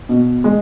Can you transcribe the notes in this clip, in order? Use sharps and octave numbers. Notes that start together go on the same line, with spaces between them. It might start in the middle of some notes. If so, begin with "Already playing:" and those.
B2
G#3